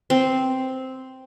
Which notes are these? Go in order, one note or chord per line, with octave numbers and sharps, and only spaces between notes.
C4